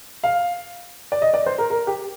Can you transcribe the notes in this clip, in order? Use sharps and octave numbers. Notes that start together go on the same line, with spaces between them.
F5
D5
D#5
D5
C5
A#4
A#4
G4